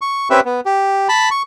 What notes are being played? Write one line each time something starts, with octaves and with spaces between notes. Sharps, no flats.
C#6
C4 C#4 G4 B4 E5
B3
G4
A5 B5
C#6